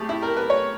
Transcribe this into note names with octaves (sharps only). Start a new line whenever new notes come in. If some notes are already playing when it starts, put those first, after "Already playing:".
Already playing: A2 A3 G4 G#4
E4
A#4
B4
C#5